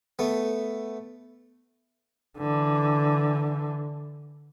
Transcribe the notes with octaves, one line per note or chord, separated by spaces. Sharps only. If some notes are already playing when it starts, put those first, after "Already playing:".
A3 B3
D3 E3